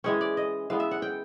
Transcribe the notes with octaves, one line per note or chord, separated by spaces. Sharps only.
E3 G#3 C#4 C#5
D5
D#5
E3 G#3 B3 F5
E5
F#5
G5